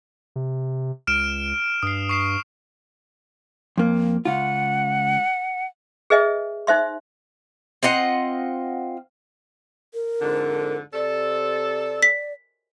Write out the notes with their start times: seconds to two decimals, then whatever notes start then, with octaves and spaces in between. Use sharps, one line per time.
0.36 C3
1.07 C#2 F6 D7 E7
1.83 G2 D#6 C7
2.09 C#6 C7 E7
3.78 F2 A#3
4.25 C#2 F4 F#5
6.10 G#4 B4 D#5 E5 G#5
6.67 D#4 C5 E5 C6
7.83 C4 F4 D#5 F#5
9.94 A#4
10.22 F2 G#2 D3
10.94 C3 A4 D5
12.03 B6